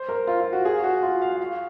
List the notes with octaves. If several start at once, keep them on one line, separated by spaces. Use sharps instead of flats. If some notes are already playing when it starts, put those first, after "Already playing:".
Already playing: C5
A#4
F4
F4
F#4
G#4
F#4
F4
F#4
F5
F#5
F5